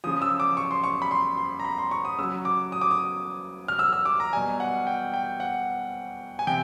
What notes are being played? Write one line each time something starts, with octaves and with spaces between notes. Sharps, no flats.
C#3 F3 D#6
E6
D6
C#6
C6
C#6
B5
C6
C6
A#5
B5
C6
C#6
D#6
C#3 F#3 E6
D6
D#6
D6
D#6
F6
E6
E6
D6
A#5
B2 G3 G#5
F#5
G5
G5
F#5
G#5
C3 G5